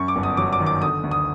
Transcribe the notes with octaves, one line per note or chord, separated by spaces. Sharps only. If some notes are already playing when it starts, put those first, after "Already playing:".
Already playing: F#2 C#6
D6
G1
D#6
F#3 D6
D6
D#3
D6
D3 D#6
D2
D#6